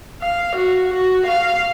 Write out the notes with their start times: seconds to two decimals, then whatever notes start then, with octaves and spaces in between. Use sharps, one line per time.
0.22 F5
0.57 F#4
0.94 F#4
1.27 F5